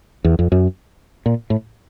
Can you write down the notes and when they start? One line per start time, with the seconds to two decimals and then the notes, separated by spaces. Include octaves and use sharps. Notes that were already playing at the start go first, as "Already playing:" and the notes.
0.24 E2
0.39 F2
0.52 F#2
1.26 A#2
1.50 A2